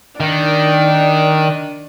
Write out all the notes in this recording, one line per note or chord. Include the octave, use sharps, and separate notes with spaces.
D#3 D4